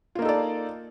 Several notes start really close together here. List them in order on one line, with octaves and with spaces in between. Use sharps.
F4 A#3 D#4 A4 D5